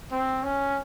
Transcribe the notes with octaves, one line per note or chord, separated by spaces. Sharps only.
C4
C#4